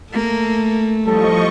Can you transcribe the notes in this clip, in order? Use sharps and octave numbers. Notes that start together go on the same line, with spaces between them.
A3 A#3
A1 F3 G3 A4 D#5 C#6